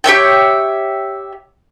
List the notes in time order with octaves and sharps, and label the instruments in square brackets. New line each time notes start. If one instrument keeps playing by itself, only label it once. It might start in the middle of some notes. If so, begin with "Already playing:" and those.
[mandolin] G4 C#5 E5 G5